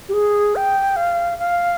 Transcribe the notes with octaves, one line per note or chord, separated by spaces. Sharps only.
G4
G#4
G5
F5
F5